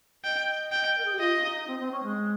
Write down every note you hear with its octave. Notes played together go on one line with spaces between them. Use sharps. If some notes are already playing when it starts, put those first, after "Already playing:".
D#5 G5
G5
A#4
G#4
G4
F4 D#5
C#4
D#4
C4
C4
C#4
G#3